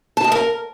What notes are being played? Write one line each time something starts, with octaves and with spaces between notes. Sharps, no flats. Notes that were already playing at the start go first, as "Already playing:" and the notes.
A5
D#5
A#4